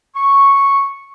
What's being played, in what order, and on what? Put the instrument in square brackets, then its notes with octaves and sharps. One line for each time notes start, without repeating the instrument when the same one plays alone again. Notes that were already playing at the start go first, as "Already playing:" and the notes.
[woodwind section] C#6